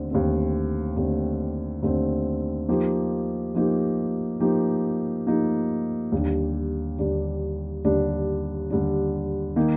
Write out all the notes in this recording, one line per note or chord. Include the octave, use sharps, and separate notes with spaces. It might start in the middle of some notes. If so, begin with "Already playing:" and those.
Already playing: D#2 D3 A3 C4
D#2 D3 A3 C4
D#2 D3 A3 C4
D#2 D3 A3 C4
F3 A#3 D#4 G4
F3 A#3 D#4 G4
F3 A#3 D#4 G4
F3 A#3 D#4 G4
D#2 D3 G3 D4
D#2 D3 G3 D4
D#2 D3 G3 D4
D#2 D3 G3 D4
D#3 A#3 D#4